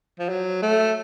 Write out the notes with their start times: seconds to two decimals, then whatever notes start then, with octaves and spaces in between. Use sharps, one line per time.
0.19 F3
0.29 F#3
0.62 A3